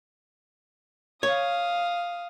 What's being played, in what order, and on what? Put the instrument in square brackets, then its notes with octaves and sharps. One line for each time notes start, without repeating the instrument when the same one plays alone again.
[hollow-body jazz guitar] C#5 [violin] F5 D#6